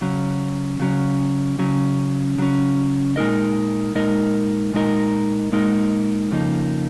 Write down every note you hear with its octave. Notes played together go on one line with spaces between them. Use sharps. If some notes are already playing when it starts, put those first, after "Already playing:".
C#3 F#3 C#4
C#3 F#3 C#4
C#3 F#3 C#4
C#3 F#3 C#4
A#2 G#3 D#4 A#4 D#5
A#2 G#3 D#4 A#4 D#5
A#2 G#3 D#4 A#4 D#5
A#2 G#3 D#4 A#4 D#5
F2 C#3 F3 A#3 D#4